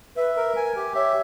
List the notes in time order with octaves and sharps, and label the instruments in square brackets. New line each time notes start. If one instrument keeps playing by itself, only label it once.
[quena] B4 [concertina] E5
[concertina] A#4
G#5
G4
[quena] C#5 [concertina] E5